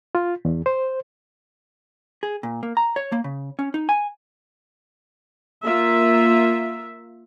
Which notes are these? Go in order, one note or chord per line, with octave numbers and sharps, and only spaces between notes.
F4
E2
C5
G#4
A#2
A#3
A#5
C#5
A#3
C#3
C#4
D#4
G#5
A#3 F4 E5